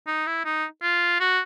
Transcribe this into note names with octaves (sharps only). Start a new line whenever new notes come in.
D#4
E4
D#4
F4
F#4